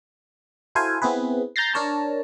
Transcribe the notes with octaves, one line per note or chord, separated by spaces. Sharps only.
E4 F#4 A4 C5 F5 G#5
B3 C4 E4 G#4 B4
A#5 G6 A6 A#6 C7
D4 A#4 C#5 A5 A#5